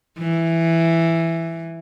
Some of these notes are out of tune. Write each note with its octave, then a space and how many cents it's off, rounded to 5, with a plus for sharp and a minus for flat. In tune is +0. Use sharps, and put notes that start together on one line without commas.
E3 +5